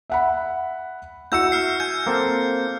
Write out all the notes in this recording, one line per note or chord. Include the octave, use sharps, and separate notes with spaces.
E5 F#5 B5
E4 F#4 E6 G6 C#7
E5 F6 C7
G#5 G6
A#3 C4 A4